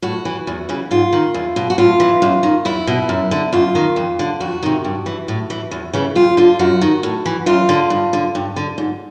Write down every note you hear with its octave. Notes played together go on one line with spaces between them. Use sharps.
A2 F#4
E3
E2
C#3 E3
G#2 F4
D#3
E2
B2
F#4
A2 F4
E3
F#2
D#3
E2 E4
B2
F#2
D3
F#2 F4
D#3
F2
D3
F2 F#4
C3 D#3
G2
E3
A2
E3
E2
C#3 E3
F2 F4
D3 F4
F#2 F#4
D#3
A2
E3
F#2 F4
D3
G2
D3
G2
D3
G#2